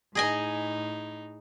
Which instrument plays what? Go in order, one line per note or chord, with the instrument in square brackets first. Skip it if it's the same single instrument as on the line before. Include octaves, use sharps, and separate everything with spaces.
[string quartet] A2 D#4 [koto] G#4 D#5 G#5